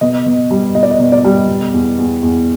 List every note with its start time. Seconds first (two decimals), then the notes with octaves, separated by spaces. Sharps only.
0.01 B2 D#5
0.26 B2
0.51 G3
0.75 B2 D#5
0.83 D5
0.91 D#5
1.00 B2
1.12 D5
1.24 G3
1.48 B2
1.73 E2
1.98 E2
2.22 E2